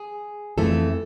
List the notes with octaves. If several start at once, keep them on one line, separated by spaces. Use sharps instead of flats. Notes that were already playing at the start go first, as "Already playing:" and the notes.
Already playing: G#4
F2 E3 A3 A4